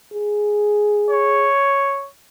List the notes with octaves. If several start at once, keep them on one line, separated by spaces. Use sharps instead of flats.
G#4
C#5